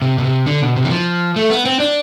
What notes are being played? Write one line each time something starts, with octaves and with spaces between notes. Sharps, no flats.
C3
B2
C3
D3
B2
C3
E3
F3
A3
B3
C4
D4